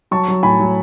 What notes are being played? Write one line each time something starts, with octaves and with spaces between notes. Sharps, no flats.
F#3 A5 C#6
F#3
A2 G#5 B5
F#3